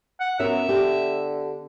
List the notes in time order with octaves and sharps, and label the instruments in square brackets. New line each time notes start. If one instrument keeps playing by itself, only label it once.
[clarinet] F#5
[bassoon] F#3 [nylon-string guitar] B3 C#4 A#4 [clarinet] E5
[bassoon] D3 [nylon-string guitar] G4